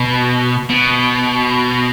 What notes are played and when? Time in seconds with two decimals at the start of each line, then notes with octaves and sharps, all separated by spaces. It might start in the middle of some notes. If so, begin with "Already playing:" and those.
Already playing: B2
0.69 B2